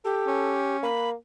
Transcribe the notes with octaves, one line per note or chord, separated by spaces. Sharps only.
G4 A4
C#4
A#3 B5